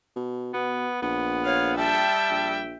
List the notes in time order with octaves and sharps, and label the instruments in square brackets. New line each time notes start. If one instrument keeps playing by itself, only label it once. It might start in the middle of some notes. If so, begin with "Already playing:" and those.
[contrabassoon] B2
[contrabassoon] B2 [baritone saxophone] B3
[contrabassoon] A#1 [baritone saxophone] B3
[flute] C#5 [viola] F5
[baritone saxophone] G3 [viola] E5 G5 [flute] A5
[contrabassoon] A#1